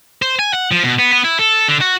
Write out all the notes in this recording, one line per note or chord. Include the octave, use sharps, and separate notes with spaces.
C5
G#5
F#5
F3
B2
B3
B3
E4
A4
D3
F#4